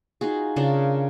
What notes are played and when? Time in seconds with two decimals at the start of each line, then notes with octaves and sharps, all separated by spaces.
0.21 D#4 F4 F#4 G#4
0.56 C#3 D4 F4 A#4